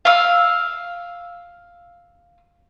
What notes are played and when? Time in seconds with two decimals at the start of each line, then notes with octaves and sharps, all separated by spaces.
0.05 F5 E6